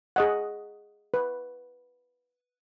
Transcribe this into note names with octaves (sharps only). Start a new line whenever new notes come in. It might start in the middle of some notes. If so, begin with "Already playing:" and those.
G#4 D#5 F#5
B4